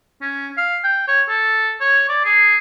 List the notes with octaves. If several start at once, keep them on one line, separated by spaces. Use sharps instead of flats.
C#4
F5
G5
C#5
A4
C#5
D5
G#4